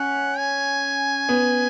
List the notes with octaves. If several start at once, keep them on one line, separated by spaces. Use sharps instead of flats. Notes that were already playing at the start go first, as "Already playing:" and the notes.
Already playing: C#4 F#5
G#5
B3